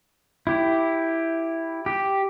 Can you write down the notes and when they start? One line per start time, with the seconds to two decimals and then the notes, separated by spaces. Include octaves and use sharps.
0.47 E4 G4
1.86 G4